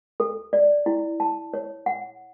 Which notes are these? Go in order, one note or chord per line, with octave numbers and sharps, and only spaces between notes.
A4
D5
E4
A5
C#5
F#5